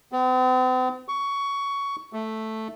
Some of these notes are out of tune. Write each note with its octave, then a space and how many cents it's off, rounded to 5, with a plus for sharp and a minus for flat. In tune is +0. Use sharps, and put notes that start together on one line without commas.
C4 -45
C#6 +15
A3 +0